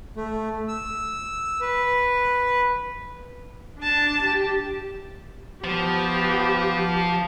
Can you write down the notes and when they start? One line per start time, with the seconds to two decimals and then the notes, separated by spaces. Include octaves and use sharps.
0.16 A3
0.68 E6
1.61 B4
3.80 D4 A5
4.23 G4
5.64 F3 B3 G4